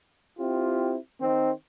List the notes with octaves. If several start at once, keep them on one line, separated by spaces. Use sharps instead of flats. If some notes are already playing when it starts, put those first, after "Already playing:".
C4 E4 F4 G4
D#3 C4